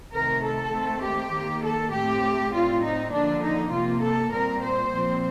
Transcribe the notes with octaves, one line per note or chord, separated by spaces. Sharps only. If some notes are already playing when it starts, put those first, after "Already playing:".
C3 D#3 A3 A#4
A4
D#3 A3 C4
G4
D#3 A#3
A4
A2 A3 C4 G4
A2 G3 C4 F4
D#4
D3 F3 A#3 D4
D#4
C3 F3 A#3 F4
A4
A#2 G3 C4 A#4
C5
A#2 F3 C4